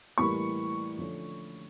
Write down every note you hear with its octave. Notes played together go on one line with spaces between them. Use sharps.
A2 E3 G3 A#3 B5 C#6
D3 F3 A3 C#4